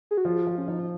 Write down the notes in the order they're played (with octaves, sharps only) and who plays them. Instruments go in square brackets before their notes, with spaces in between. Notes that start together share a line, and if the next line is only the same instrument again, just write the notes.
[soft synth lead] G#4
F#4
[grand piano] F3 [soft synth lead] F4
[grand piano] F3
[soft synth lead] C#4
[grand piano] F3 [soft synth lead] D#4
[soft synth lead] F4